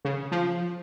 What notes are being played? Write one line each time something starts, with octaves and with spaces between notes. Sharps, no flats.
C#3
F3